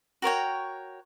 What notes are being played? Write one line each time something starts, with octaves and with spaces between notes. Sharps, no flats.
F#4 A#4 C#5 G5